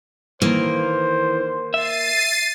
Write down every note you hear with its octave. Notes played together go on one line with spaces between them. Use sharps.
D#3 E3 A#3 C5
E5 A6 C7 D#7